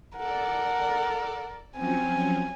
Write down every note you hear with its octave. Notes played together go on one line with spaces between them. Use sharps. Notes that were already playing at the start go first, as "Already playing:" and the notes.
A4 A#4 D5 F#5
F3 F#3 C4 C#4 G#5